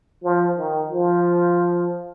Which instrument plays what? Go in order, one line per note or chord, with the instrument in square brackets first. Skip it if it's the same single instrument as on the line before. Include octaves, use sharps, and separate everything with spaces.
[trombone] F3
D#3
F3